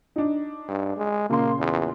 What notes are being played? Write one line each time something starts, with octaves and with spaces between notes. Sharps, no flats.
D4 D#4
G2
G#3
A#2 C#3 A#3 C6
E2